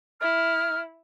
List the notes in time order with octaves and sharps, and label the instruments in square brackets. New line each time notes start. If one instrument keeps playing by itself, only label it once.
[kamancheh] E4 [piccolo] F6